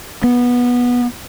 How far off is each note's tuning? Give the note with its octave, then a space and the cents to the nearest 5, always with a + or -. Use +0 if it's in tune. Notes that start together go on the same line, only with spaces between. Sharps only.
B3 -15